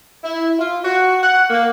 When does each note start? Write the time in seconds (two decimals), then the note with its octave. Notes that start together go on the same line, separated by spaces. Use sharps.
0.23 E4
0.59 F4
0.84 F#4
1.23 F#5
1.50 A#3